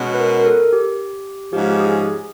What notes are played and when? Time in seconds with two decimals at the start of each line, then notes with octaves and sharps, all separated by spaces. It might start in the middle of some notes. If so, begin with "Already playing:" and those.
Already playing: B2 G#3 C#4 F#4
0.14 B4
0.20 A#4
0.39 A#4
0.46 A4
0.73 G4
1.53 G#2 F3 G#3 C#4 G4
1.70 G4
1.80 G#4